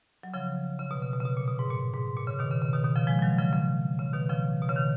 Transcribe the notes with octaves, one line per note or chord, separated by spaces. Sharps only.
F#3
C#3 F3
C#3
B2
C#3
B2
C#3
B2
A#2
B2
G#2
A#2
G#2
A#2
C#3
B2 D#3
C#3
C#3
B2 D#3
B2 D#3
C#3 F3
F3 G#3
F3
D#3 F#3
C#3 F3
C#3 F3
C#3
B2 D#3
C#3 F3
B2
C#3
D#3